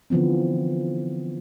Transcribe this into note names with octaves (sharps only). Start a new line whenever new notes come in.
D3 E3 F3 B3 C4